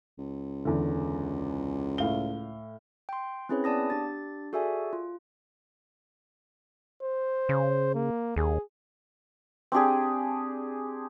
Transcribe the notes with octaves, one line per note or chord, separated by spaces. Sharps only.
C#2
E2 D3
A2 F5 G7
G5 C6
C4 C#4 E4 G#4 B4 C#5
B3 D5 A5 D#6 A#6
D4 G4 A6
F#4 G#4 A4 D5 E5 G#5
F4
C5
C#3
A#3
D#2 G#4
C4 D4 G4 G#4